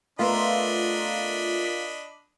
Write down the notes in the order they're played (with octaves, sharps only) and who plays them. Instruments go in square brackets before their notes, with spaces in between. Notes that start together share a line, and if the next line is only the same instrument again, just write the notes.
[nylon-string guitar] A3 B3 [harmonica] D4 D#5 B5 [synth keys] F4 A#4 [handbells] E5